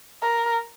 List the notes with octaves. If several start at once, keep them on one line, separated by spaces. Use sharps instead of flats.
A#4